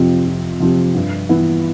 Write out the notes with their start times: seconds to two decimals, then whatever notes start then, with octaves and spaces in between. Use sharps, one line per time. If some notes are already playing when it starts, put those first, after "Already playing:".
Already playing: F2 C3 F3 C4 G4
0.26 F2
0.60 C3 F3 C4 G4
0.95 G2
1.29 E3 B3 E4